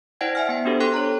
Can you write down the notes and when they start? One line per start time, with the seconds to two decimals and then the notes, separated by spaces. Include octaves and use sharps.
0.21 E4 C5 D5 F#5 G5 G#6
0.35 E5 G#5 F6
0.49 B3 G5
0.65 B3 D4 F#4 G4 A4 C5
0.80 A4 G5 C6 F#6
0.94 C#5 A#5